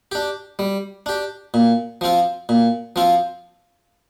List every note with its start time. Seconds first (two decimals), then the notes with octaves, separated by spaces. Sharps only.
0.12 D4 G4
0.59 G3
1.06 D4 G4
1.54 A#2
2.01 F3 C4 F4
2.49 A#2
2.96 F3 C4 F4